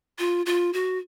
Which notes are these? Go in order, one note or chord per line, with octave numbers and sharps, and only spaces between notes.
F4
F4
F#4